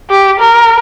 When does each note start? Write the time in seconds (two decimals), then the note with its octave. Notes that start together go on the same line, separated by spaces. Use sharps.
0.10 G4
0.39 A#4